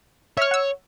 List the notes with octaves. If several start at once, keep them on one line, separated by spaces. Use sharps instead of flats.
C#5 E5 F6
F#5 E6